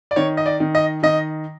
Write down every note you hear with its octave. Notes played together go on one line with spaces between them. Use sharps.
D5
D#3 C#5
D#5
D5
D#3
D#5
D#3 D#5